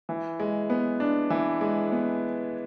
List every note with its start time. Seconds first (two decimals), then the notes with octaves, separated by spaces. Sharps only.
0.09 E3
0.40 G#3
0.70 B3
1.00 D4
1.30 E3
1.61 G#3
1.92 B3